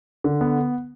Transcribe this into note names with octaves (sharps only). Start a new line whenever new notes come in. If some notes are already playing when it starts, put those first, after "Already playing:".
D3
B3